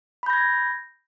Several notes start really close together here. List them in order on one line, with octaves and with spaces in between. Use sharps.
B5 G6 A#6 G#6